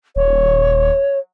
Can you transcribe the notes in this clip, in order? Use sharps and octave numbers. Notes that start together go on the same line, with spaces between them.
D#1 C#5